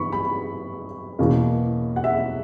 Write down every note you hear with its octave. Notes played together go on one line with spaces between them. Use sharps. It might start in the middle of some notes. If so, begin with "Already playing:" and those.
Already playing: G2 E3 B3 B5 C#6
B5
E2 B2 A#3 C#4
F#5
E5